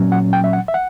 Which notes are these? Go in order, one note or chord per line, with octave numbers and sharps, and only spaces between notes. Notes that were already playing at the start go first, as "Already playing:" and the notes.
Already playing: A#2 F#3 C#4
F#5
G5
E5
F#5
E5
F#5